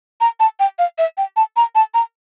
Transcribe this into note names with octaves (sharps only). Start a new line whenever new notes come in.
A#5
A5
G5
F5
E5
G5
A5
A#5
A5
A#5